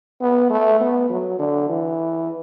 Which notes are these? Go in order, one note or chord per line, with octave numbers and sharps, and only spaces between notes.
B3
A3
B3
F#3
D3
E3